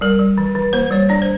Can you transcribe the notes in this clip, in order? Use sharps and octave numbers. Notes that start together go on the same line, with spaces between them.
G3 A#4
G3
E3
E3
A#3 C5
G3 C#5
D4 D5
C5